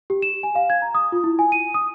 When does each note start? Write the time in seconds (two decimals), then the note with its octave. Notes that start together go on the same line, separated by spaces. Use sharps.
0.10 G4
0.22 E7
0.43 G#5
0.55 F5
0.70 G#6
0.82 A#5
0.95 D#6
1.12 F4
1.24 E4
1.39 G#5
1.52 D#7
1.74 D#6